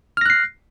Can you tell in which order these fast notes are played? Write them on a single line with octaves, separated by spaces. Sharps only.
F6 A#6 F#6 C7